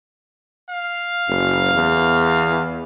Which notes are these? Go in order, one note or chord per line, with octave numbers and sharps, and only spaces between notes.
F5
F#1
E2